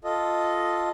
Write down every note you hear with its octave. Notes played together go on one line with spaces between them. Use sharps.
F4 A4 D#5